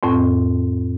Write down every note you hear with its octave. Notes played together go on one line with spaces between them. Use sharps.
F2 A2 C4